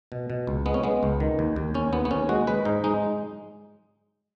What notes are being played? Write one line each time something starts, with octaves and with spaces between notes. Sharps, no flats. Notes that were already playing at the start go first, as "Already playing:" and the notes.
B2
B2
C#2
G#3 B3
C#4
G#3 B3
C#2
D#3
D#2
D#2
D#2 C#4
D#2 B3
B3
D#2 C#4
G#3 F#4
G#3 B4
G#2 D#4
G#3 D#4